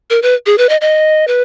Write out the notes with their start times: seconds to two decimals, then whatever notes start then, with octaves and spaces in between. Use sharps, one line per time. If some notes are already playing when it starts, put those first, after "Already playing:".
0.10 A#4
0.22 B4
0.46 G#4
0.58 B4
0.69 D#5
0.81 D#5
1.28 B4